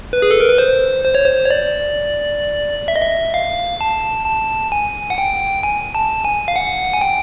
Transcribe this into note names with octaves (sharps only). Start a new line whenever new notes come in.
B4
G#4
A4
A#4
B4
C5
C5
C#5
C5
C#5
D5
E5
D#5
E5
F5
A5
A5
G#5
F#5
G5
G#5
A5
G#5
F5
F#5
G#5
G5